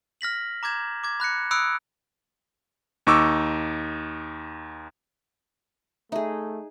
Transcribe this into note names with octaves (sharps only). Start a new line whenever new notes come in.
F6 A#6 B6 F#7
A#5 D6 G6 G#6 E7
D6 G#6
B5 F#6 A#6 C#7
B5 D#6 E6 F#6 C#7 D7
D#2 D#4 C#6 D6 E6
A3 D#4 G#4 E5